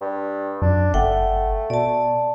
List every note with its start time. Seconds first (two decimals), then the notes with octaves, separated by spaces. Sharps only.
0.01 G2
0.62 F#2 D4
0.94 G1 A3 F#5 G5
1.70 B2 D5 A5